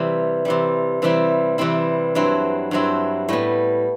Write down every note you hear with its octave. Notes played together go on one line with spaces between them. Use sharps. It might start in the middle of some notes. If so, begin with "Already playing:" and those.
Already playing: C3 E3 G3
C3 E3 G3
C3 E3 G3 C4 E4
C3 E3 G3 C4 E4
G2 F#3 C4 E4
G2 F#3 C4 E4
A2 G3 B3